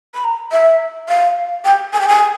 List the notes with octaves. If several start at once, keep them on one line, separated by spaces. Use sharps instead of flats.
B5
A#5
E5
F5
G5
G#5
G5
G#5